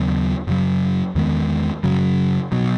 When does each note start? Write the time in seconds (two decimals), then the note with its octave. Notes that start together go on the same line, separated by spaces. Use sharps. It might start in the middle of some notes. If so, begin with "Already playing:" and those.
Already playing: D#2 C#3 F#3 B3
0.47 F#2 C#3 F#3
1.15 E2 D#3 G#3 B3
1.83 F#2 C#3 F#3
2.52 B2 F#3